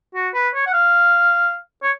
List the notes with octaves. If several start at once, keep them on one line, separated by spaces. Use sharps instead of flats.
F#4
B4
C#5
F#5
F5
C#5